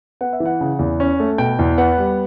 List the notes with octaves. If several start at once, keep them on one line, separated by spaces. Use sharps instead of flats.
B3 F#5
E5
E3
F#5
C#3
E2
C#4
A3
B2 G5
E2
B3 F#5
G3